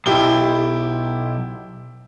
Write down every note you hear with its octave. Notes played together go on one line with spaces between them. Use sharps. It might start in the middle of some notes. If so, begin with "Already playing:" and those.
B1 E4 G4 G7